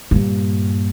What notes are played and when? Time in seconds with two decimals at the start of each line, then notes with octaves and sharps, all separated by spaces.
0.11 G2 A#2